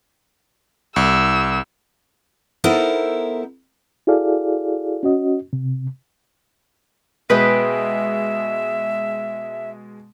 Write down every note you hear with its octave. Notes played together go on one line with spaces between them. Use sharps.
C2 E6
B3 D#4 E4 A4 A#4 C5
E4 F#4 G#4 A4 D5 F5
C#4 F#4 D#5
C3
B2 G#3 B4 D#5 E5 G5